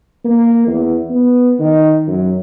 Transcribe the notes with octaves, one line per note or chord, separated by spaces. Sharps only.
A#3
E2
B3
D#3
F#2